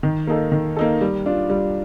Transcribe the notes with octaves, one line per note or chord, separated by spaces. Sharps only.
D#3
A#3 D#4 A4
D#3
A#3 D#4 A4
G3
D4 F4
G3